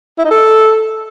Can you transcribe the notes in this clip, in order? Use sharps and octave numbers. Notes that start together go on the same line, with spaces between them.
E4
D#4
A4